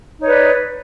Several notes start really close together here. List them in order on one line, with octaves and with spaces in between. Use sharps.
D#4 C#5 B4 D5